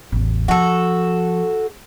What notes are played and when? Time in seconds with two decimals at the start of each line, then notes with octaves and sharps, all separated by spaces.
0.12 A1 E2
0.48 F3 F#4 A4